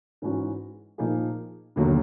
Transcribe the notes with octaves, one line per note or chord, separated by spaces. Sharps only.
G#2 E3 G#3 C#4 F#4
A#2 F3 A#3 D#4 G#4
E1 D#2 D3 F#3 A#3